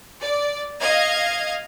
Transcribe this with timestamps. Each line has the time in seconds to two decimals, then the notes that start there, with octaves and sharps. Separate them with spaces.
0.21 D5
0.82 D#5 F5 G#6